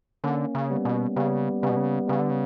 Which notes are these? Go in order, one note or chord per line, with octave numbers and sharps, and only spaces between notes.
D3 A#3 C#4
C#3
G3 B3
B2
C#3 G3 B3
C#3 G3 B3
B2
C#3
C#3 G3 B3
D3
C#3